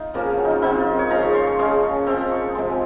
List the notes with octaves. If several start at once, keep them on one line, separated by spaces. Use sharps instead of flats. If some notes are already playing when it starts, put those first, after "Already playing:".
Already playing: D#4 F4
C#3 F3 A#3 C#4 A#4
G#4
F#4
D#4
F4
C3 F#3 C4 D#4
F4
C#5
C#3 F3 G#3 A#5
C#6
C6
C#6
C#3 G#3 C#4 C6
C#6
F3 G#3 C4 A#5
C#6
C3 F3 G#3 C4 C6
G#5